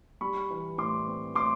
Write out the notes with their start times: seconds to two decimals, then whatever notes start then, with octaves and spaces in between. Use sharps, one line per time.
0.21 G3 B5 C#6
0.50 E3
0.78 A2 C6 D6
1.07 C4
1.35 A2 C6 D6